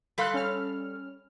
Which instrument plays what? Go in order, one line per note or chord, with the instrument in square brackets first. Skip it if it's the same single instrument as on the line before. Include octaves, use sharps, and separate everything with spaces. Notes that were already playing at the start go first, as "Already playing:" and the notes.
[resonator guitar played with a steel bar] G3 A4 F5 [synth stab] B5 C6 F#6
[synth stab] C#4 F6